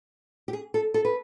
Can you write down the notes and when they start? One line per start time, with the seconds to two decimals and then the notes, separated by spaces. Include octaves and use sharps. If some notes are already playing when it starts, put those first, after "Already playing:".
0.48 G4
0.53 G#4
0.74 A4
0.94 A4
1.05 B4